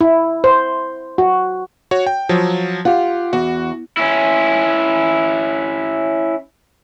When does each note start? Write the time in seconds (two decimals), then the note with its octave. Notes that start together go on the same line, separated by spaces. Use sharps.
0.01 E4
0.44 C5
1.18 F#4
1.91 F#4 C#5
2.06 G5
2.29 F3 F#3
2.85 F4 G4 F#5
3.33 E2 F#4
3.97 C#4 E4